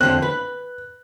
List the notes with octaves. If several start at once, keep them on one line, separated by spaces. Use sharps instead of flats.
F2 D3 C4 F#6
B4